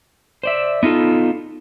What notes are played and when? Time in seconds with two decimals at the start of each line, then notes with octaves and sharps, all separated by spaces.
0.43 C5 D5 E5
0.83 B3 D#4 F4 A4